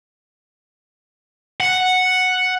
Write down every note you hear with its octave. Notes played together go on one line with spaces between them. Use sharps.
F#5